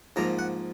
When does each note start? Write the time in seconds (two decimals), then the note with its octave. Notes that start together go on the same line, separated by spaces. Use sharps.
0.16 G#2 F3 A#3 A#5
0.39 F#5